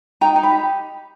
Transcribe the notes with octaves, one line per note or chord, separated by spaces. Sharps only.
D#4 G5 A#5
D#4
B5
G4